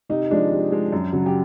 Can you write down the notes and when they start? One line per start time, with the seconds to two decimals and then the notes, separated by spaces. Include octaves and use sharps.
0.09 C3 D#4
0.30 F3 G#3 D4
0.51 C3
0.72 F3 G#3
0.92 F#2
1.13 C#3 F#3
1.26 G4